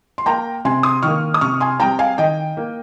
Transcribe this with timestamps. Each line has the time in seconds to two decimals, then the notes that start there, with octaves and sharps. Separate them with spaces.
0.18 C6
0.26 A#3 G5 A#5
0.65 C3 G#5 C6
0.83 C6 D#6
1.02 D#3 A#3 C#6 F6
1.34 D#6
1.41 C3 C#6 F6
1.60 G#5 C6
1.80 G3 C4 G5 A#5
1.99 F5 G#5
2.18 D#3 D#5 G5
2.57 A#3